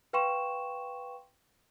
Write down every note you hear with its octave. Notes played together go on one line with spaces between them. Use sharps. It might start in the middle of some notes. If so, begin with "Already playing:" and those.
B4 F5 G5 C6 C#6 E7